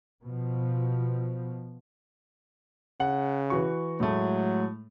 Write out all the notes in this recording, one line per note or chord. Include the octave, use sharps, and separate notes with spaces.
B2 F3
C#3 F#5
E3 F#4 C#6
A2 F#3 G#3 A3